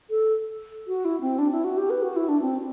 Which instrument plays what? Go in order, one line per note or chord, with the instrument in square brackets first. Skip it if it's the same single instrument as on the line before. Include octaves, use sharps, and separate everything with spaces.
[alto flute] A4
F#4
E4
C4
D4
E4
F#4
G4
B4
F#4
E4
D4
C4